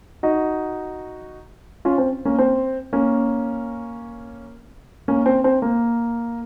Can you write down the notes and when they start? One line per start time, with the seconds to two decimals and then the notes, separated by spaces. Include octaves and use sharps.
0.23 D#4 F#4
1.85 C#4 F4
1.98 C4
2.25 A#3 C#4
2.38 C4
2.93 A#3 C#4
5.08 A#3 C#4
5.26 C4
5.44 C4
5.62 A#3